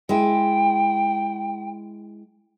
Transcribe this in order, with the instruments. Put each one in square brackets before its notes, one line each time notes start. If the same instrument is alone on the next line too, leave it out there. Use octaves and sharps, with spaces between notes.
[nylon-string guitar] G#3 E4 [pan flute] G5